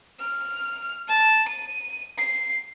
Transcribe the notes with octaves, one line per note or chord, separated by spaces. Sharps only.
F6
A5
D#7
C7